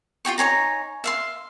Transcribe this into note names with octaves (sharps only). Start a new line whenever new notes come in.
F4 G4 G5 C#6
D#4 C#5 G#5 A#5
E5 F5 C6